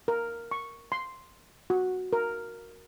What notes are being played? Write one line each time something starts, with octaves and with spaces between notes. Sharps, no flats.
A#4
C#6
C6
F#4
A#4